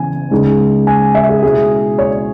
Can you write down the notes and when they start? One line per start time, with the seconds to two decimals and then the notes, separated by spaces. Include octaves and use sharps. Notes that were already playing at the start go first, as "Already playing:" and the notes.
Already playing: C#3 E3 B3 E4 G#5
0.31 C#3 G#3 D#4
0.87 G#5
1.15 E5
1.29 G#4
1.43 B2 G#3 C#4 E4 G#4
1.99 C#5